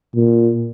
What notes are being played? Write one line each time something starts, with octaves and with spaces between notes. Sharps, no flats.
A#2